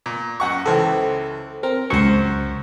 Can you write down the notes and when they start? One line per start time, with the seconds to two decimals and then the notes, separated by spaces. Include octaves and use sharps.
0.06 A#2
0.40 F#2 F#5 C#6
0.66 C#2 E3 A4 C5
1.63 C4 A#4
1.90 C#2 F#2 C5 C#6